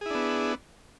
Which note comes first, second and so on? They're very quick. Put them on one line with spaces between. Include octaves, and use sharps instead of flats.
G#4 E4 D4 B3